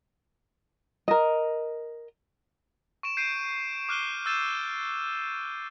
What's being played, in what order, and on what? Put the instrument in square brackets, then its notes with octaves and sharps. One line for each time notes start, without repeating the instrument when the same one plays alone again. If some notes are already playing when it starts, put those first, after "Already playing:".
[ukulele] A#4 D#5
[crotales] C#6 D7 E7
G6 C7 D7 D#7
D6 F6 F#6 D#7 G7
E6 G6 A6 D#7 E7